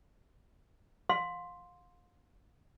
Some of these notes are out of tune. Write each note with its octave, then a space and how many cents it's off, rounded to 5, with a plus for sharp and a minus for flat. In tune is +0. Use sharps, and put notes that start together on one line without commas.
F5 +30 C6 +0